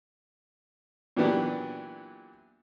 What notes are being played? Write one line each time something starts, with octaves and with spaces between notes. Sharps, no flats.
A#2 E3 F#3 B3 D4 G4